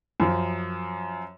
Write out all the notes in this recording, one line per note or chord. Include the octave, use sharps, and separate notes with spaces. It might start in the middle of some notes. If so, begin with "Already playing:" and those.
F#2 F3